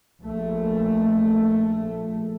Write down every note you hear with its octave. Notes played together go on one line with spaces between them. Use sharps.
A#1 A3